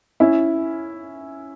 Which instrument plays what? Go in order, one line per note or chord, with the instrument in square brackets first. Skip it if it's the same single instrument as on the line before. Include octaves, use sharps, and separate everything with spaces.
[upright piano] C#4 E4